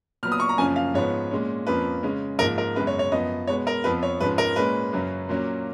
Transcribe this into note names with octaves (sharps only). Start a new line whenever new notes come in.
A#2 F#3 B3 F6
D#6
C#6
A#5
F#2 C#3 F3 A#3 C#4 G#5
F5
G#2 F3 B3 C#5
A#2 G#3 C#4
F2 F3 A#3 C#4 B4
C#3 G#3 C#4
G#2 F3 A#3 A#4
A#4
F#2 C#3 G#3 B3 B4
C#5
C#5
F#2 F3 B3 D#5
B2 G#3 B3 C#5
A#4
F2 F3 B3 B4
C#5
G#2 F3 G#3 C#4 B4
A#4
A#2 G#3 C#4 B4
F#2 C#3 F#3 C#4
A#2 F#3 A#3 C#4